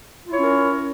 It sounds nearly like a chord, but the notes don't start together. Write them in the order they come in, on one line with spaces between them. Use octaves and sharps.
F4 E4 C#5 C#4 A#4